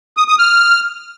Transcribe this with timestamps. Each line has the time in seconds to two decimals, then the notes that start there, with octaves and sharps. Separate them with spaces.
0.17 D#6
0.28 D#6
0.39 F6